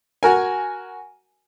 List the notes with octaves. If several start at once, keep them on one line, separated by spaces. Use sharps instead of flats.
F#4 A#4 G#5